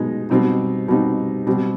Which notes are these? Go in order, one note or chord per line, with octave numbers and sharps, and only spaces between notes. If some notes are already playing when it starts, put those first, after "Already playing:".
Already playing: B2 G#3 B3 D#4
B2 G3 C4 D#4
B2 G3 C4 D#4
B2 G3 C4